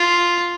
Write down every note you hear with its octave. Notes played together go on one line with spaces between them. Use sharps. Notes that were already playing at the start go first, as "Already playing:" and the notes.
Already playing: F4